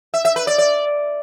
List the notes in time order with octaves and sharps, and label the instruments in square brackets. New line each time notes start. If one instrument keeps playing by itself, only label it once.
[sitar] E5
E5
B4
D5
D5